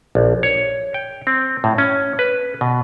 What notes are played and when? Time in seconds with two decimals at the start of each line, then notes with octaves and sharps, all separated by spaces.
0.15 A#1
0.43 C#5
0.94 G5
1.27 C4
1.64 A2
1.78 C#4
2.19 B4
2.61 B2